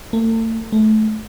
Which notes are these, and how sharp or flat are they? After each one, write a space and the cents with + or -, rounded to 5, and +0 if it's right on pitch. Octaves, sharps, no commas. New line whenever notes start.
A3 +40
A3 -20